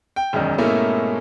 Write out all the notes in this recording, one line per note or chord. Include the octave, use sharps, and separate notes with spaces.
G5
E1 F#2 D#3
G#2 B2 A3 A#3 C#4 E4